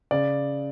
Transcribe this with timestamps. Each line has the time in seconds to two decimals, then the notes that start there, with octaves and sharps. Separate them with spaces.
0.11 C#3 D5